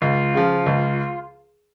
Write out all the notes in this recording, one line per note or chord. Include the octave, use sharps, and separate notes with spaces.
C#2 F4
C#3 F3
C#2